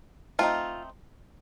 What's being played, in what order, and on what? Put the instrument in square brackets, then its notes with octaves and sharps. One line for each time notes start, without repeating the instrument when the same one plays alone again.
[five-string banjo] A3 C4 D#4 F4